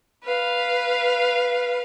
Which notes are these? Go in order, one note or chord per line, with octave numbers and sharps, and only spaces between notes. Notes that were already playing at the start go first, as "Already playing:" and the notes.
B4 F5